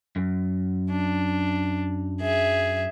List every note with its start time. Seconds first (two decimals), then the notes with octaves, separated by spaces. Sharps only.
0.16 F#2
0.91 D4
2.21 G#4 E5